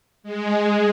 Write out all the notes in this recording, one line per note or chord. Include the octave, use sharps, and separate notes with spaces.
G#3